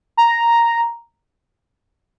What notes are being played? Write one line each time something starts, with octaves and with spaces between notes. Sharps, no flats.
A#5